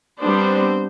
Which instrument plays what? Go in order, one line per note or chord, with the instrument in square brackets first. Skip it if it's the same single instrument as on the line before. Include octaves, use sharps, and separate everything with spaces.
[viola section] G3 B3 C4 D4 C5